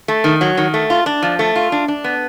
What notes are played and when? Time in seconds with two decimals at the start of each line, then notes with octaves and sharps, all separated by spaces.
0.08 A3
0.24 D#3
0.41 F#3
0.57 D#3
0.74 A3
0.90 F4
1.06 D4
1.23 F3
1.39 A3
1.56 F4
1.72 D4
1.88 D4
2.04 B3